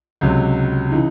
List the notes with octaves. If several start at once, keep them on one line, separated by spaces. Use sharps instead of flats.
C#2 C3 F#3
C#3 E3 D#4